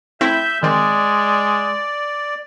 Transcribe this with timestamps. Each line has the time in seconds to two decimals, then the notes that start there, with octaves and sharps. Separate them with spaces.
0.21 A3 C4 E4 E5 G6
0.63 D#3 G#3 C4 D5